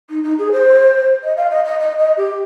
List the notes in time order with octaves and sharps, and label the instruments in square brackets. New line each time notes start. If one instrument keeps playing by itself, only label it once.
[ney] D#4
D#4
G#4
C5
D#5
F5
D#5
D#5
D#5
D#5
G4